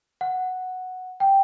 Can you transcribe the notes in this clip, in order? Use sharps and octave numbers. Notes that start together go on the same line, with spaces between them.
F#5
G5